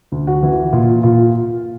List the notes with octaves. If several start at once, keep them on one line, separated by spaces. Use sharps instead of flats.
D2
F#4
E3
A#2 F4
A#2 F4